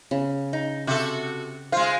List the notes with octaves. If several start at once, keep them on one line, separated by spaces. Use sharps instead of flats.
C#3
D#4
C3 F#4 A4
G#3 F4 C5 F5